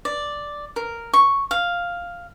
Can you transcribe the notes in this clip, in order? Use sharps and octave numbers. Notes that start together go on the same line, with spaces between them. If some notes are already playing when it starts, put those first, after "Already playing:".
D5
A#4
C#6
F5